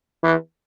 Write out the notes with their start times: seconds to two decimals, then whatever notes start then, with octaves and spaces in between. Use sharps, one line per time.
0.23 E3